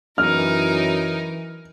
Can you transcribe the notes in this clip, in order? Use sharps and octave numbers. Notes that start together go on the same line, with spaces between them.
F#2 E3 D#4 A#4 F6